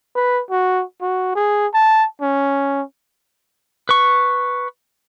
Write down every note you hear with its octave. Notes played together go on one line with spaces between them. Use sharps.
B4
F#4
F#4
G#4
A5
C#4
B4 C#6